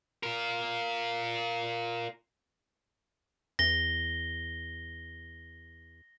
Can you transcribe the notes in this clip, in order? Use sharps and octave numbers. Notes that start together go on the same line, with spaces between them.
F4 A#4
E2 A#6 G7